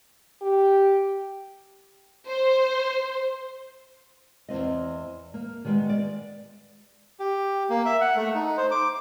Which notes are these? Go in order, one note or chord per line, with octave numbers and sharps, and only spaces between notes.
G4
C5
E2 D#3 C4 D#5
A#3
D#3 G3 G#3 B3
D5
G4
A#3
E5
F#5
A3
D#4
C5
D6